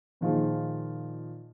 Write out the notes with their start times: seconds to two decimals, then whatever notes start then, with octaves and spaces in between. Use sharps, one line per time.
0.21 A#2 D#3 F3 D#4 F4 G#4